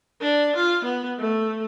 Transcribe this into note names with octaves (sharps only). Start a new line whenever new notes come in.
D4
F4
B3
A3